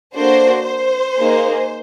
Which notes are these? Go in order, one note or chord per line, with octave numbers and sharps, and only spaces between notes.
A#3 D4 F#4 A4 C5
C5
A#3 D#4 G#4